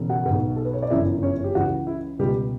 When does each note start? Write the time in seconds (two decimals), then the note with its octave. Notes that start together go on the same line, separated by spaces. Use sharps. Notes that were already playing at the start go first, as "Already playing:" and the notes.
Already playing: E1 E2 C#3
0.09 F#4 F#5
0.25 B1 B2
0.56 A4
0.65 B4
0.73 C#5
0.82 D5
0.90 G1 F#2 C#3 E3 E4 E5
1.22 C#4 C#5
1.44 G4
1.55 C#2 C#3 E3 F#4
1.87 E4
2.19 C#2 B2 G3 G4